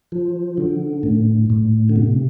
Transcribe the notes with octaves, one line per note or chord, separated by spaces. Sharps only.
F3
D3
A2
A2
D3
C3